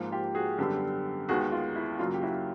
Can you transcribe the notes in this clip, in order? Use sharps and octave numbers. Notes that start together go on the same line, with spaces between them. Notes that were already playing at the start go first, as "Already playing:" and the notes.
Already playing: G#2 F3 A#3
F4 G4
F#4 G#4
F#2 D3 G3 B3 G4 A4
D#2 D#3 G#3 B3 F#4 G#4
F4
E4
F#2 C#3 F#3 A#3 F4
G4
E4 F#4